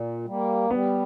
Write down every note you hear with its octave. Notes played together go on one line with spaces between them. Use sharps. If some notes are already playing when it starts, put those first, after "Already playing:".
Already playing: A#2
G3 A#3
G3 B3